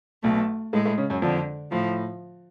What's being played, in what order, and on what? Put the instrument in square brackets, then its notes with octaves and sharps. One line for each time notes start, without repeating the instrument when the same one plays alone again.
[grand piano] B1 B2 [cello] A3
[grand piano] A2 A3 [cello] G#3
[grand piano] A2 A3
C#3 C#4
F#2 F#3
[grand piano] F2 F3 [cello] D3
[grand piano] A2 [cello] F3